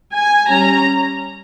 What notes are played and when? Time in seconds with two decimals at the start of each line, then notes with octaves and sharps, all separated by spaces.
0.13 G#5
0.47 G3 C#4 A#5